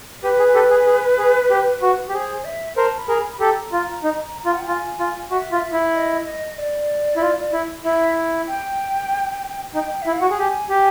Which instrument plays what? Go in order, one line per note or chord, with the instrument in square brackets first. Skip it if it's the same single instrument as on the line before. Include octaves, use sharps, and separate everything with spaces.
[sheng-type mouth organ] G4 [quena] B4
[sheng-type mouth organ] G#4
G4 A4
G#4
G#4
G#4
G4
F#4
G4
[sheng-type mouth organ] G#4 [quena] C5
[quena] E5
[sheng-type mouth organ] A#4 C5 [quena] A5
[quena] B5
[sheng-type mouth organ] G#4 A#4
[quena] A#5
B5
B5
[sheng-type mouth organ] G4 A4 [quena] A#5
[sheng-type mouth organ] F4
D#4
F4
[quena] F#5
G5
[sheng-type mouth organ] F4 [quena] G#5
[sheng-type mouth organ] F4
[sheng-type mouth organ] F#4 [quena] E5
[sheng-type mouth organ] F4
E4
[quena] D#5
D#5
D5
[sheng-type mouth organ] E4
F4
E4
[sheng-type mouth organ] E4 [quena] E5
[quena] G5
[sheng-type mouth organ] D#4 [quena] G5
[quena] E5
[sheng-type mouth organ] E4
[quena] F5
[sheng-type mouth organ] F#4 [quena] F#5
[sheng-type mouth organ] G#4 [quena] G5
[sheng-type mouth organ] G4 [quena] G#5
[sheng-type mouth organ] G4